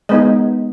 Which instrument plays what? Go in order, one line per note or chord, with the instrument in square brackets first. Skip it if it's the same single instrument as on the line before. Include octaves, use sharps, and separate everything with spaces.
[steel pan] G#3 B3 D#4 D#5